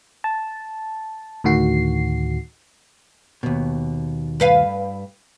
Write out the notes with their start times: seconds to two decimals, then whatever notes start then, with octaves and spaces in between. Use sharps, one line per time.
0.24 A5
1.44 D2 A2 D#3 F#4 C7
3.43 D#2 B2
4.40 G2 B4 F5